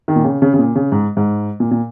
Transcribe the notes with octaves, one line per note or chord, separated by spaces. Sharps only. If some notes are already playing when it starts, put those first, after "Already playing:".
D#3
A#2
C#3
C#3
C#3
A#2
C#3
G#2
G#2
A#2
A#2